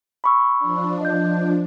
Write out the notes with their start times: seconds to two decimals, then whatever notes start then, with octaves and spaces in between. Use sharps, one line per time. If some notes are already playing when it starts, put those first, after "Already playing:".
0.24 B5 C#6 E6
0.59 F3 D4
1.01 D#5 G6